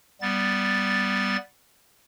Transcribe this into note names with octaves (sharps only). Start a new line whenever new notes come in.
G3 B3 A6